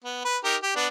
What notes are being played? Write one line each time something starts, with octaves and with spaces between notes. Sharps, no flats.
B3
B4
D#4 G4 A#4
G4
B3 D4